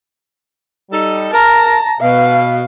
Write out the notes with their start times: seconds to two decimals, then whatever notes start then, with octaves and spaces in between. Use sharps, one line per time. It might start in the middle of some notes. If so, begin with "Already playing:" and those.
0.91 G3 D#4 A4
1.31 A#4 A5 A#5
2.00 B2 F5